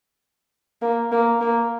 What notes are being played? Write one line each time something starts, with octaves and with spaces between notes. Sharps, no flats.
A#3
A#3
A#3